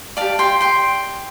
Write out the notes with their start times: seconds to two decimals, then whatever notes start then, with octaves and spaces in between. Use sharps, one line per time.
0.17 G4 D5 F5 A5
0.39 G5 C6
0.60 G5 C6